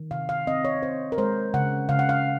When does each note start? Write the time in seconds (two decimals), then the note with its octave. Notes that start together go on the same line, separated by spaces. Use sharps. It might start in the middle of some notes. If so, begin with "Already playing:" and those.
Already playing: D#3
0.11 C3 F5
0.29 F5
0.47 C4 D#5
0.65 C#5
0.82 C4 C5
1.12 A#4
1.18 G#3 C5
1.54 C#3 F#5
1.89 C#3 F5
1.99 F#5
2.09 F5